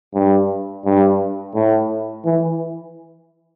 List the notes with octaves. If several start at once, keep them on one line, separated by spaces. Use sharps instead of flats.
G2
G2
A2
E3